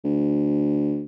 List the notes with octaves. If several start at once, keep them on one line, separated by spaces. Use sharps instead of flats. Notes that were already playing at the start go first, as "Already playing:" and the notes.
D2